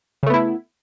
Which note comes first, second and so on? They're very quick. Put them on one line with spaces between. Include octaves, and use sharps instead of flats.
C#3 A3 B3 E4